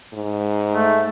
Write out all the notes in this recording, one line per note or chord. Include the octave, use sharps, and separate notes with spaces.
G#2
A3